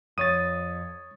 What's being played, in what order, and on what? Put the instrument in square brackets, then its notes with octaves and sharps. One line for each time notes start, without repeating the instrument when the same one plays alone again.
[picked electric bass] F2 [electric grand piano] C#5 D#7 [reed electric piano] D#6 A6